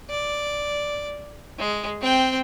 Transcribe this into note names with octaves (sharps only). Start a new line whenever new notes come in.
D5
G#3
C4 G5